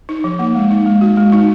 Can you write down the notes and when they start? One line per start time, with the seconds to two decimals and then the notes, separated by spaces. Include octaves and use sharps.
0.09 D#4
0.24 F3
0.39 A#3
0.55 G#3
0.71 D#4
0.86 G#3
1.01 F#4
1.17 G#3
1.32 D#4